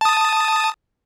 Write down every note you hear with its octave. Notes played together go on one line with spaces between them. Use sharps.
A5 D#6